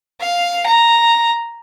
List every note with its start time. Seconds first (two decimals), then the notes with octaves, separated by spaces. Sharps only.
0.21 F5
0.66 A#5